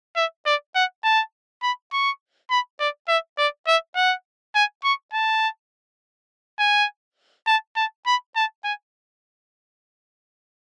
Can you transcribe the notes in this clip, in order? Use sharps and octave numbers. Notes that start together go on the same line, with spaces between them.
E5
D5
F#5
A5
B5
C#6
B5
D5
E5
D5
E5
F#5
G#5
C#6
A5
G#5
A5
A5
B5
A5
G#5